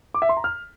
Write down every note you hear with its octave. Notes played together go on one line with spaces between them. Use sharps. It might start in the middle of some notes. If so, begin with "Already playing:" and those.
D6
E5
C6
A#5
F6